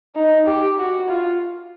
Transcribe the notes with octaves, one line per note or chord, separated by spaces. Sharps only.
D#4
G4
F#4
F4